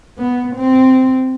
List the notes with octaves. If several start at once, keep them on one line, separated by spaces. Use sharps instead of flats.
B3
C4